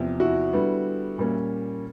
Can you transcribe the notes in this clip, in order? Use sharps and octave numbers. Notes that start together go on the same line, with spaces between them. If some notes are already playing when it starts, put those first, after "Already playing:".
Already playing: E2 C3 F3
E4 F#4
D3 G3 B3
A#2 G3 A#3 C#4